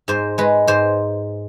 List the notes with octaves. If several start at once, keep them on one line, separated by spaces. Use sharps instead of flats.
G#2 C5
G#3 B4
G#2 C5